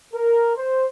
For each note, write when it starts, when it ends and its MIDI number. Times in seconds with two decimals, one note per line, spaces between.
0.14 0.55 70
0.55 0.85 72